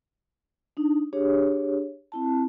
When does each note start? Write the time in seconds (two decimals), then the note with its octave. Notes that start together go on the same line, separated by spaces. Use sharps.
0.77 D4 D#4
1.13 D4 G4 G#4 C#5
2.12 C4 E4 A5